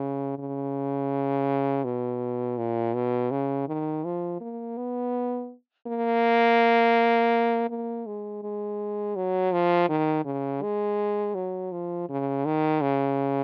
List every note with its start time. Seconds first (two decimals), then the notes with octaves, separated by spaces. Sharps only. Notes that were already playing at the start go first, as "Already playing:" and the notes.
Already playing: C#3
0.39 C#3
1.85 B2
2.58 A#2
2.95 B2
3.31 C#3
3.68 D#3
4.05 F3
4.41 A#3
4.77 B3
5.87 A#3
7.70 A#3
8.06 G#3
8.43 G#3
9.16 F#3
9.53 F3
9.89 D#3
10.25 C#3
10.63 G#3
11.35 F#3
11.72 F3
12.09 C#3
12.46 D#3
12.82 C#3